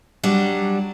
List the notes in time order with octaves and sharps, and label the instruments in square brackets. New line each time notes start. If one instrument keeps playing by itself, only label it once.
[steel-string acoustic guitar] F#3 G3 D4